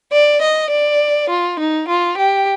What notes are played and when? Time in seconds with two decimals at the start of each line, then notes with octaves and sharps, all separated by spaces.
0.12 D5
0.42 D#5
0.71 D5
1.30 F4
1.59 D#4
1.88 F4
2.18 G4